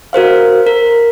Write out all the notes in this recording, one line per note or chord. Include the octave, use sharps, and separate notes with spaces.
F#4 A#4 C5 F5
A#4